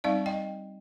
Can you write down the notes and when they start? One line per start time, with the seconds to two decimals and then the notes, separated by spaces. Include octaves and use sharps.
0.04 G3 C4 D#4 D5 F5
0.26 D#5 G5